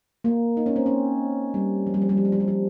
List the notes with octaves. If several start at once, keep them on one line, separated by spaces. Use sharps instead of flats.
A#3
D#4
C#4
C4
C#4
G3
F3
G3
F3
G3
F3
G3
F3
G3
F3